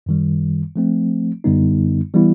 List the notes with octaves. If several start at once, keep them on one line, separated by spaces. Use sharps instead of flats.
F#2 D#3 G3
F3 A3 C4
F#2 D3 G3 B3 D#4
E3 G3 B3 E4